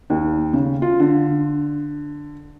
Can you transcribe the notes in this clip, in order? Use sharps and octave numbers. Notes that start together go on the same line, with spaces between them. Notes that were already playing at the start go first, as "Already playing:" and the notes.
D#2
C#3
F4
D3